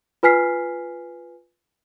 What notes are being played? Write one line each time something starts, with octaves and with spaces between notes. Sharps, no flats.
F4 B4 G#5 F6 B6 C7